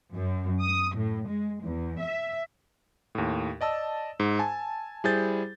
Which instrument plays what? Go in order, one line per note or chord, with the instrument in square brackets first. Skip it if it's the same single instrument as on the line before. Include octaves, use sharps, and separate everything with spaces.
[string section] F#2
D#6
A2
G#3
E2
E5
[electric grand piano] D#2 A2
D5 D#5 A5 E6
G#2
G#5 A5
G3 E4 G#4 C5 G6 A6